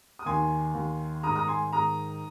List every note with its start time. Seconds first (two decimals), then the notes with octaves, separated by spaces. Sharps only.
0.19 D#6
0.26 D#2 D#3 G#5 C6
0.74 D#2 D#3
1.23 G#2 D#3 A#5 D#6
1.36 A#5 D#6
1.48 G#5 C6
1.73 G#2 D#3 A#5 D#6